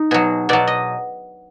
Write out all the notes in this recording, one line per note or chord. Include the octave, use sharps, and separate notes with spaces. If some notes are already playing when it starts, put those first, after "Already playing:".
Already playing: D#4
B2 F#3 G#4
B2 F#3 D5
D#5